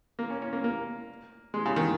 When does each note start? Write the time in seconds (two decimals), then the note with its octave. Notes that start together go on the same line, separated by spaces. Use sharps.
0.19 A#3
0.30 C#4
0.42 C#4
0.53 A#3
0.64 A#3
1.54 G#3
1.66 C#3
1.76 D#3